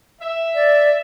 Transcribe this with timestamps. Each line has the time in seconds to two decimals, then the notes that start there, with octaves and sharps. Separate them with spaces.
0.20 E5
0.55 D5